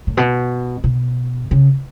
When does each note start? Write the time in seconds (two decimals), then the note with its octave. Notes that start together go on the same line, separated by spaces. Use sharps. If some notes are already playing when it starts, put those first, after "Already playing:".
0.07 A2
0.17 B2
0.84 B2
1.51 C#3